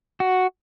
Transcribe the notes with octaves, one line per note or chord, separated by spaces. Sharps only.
F#4